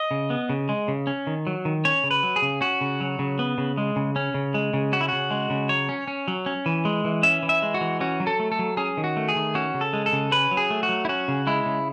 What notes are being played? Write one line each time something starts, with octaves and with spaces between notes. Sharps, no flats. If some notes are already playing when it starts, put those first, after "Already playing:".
Already playing: D#5
C#3
B3
C#3
G#3
C#3
C#4
D#3
F#3
D#3
C#4 C#5
C#3
B4
F#3
G#4
C#3
C#4 F#4
C#3
F#3
C#3
B3
C#3
G#3
C#3
C#4
C#3
G#3
C#3
C#4 F#4
E4
C#3 F#4
G#3
C#3
F#3 C#5
C#4
C#4
F#3
C#4
E3
G#3
E3
C#4 E5
E3
E5
G#3
F#4
E3
C#4 F#4
F#3
A4
A3
A4
F#3
C#4 G#4
D#3
F#4
A3
G#4
D#3
C#4 F#4
C#3
A4
G#3
A4
C#3
C#4 B4
F#3
G#4
A3
F#4
F#3
E4
C#4 F#4
C#3
G#3 E4
C#3